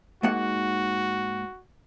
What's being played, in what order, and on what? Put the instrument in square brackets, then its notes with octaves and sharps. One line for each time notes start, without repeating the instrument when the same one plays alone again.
[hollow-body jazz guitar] G#2 A#3 F#5 [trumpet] F#4